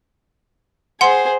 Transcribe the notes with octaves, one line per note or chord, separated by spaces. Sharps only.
G#4 C5 F#5 C6